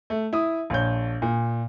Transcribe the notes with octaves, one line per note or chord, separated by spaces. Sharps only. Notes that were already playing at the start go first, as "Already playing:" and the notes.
A3
E4 D#6
A#1 C#5 G6
A#2